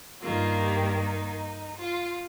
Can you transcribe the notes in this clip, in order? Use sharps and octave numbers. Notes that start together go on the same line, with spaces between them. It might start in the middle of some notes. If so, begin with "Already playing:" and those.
G2 D#3 A#3 F4
G4
D#4
F4